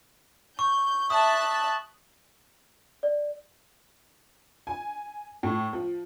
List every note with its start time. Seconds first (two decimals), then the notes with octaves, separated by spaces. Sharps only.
0.59 C#6 G6
1.10 E5 A5 D#6 F#6
3.03 D5
4.67 G#5
5.43 A2
5.73 F3